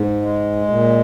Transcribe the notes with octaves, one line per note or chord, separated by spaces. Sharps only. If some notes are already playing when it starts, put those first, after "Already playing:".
Already playing: G#2
G#3
A#2